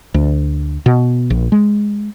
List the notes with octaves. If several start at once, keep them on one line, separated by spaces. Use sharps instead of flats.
D2
B2
A#1
G#3